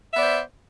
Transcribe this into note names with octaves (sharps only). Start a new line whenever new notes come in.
B3 C5 D5 E5